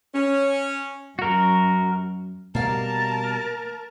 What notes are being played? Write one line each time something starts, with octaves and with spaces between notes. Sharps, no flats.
C#4
F#2 F#4 A#4
B2 G3 A#3 A#4 F5 A5